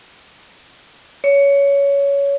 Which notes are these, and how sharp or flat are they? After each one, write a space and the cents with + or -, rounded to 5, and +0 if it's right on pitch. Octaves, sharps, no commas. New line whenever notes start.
C#5 +15